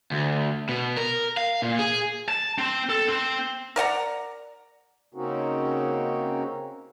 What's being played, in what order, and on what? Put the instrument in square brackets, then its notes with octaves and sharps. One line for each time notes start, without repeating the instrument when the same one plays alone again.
[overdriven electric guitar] D2
B2
A#4
F5
A#2
G#4
[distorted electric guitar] A5
C4
A4
C4
[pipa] A#4 D5 F#5 A#5
[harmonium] C#3 A#3 C4 C#4 D#4 F#4